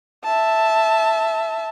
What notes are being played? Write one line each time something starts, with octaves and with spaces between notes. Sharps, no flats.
E5 A5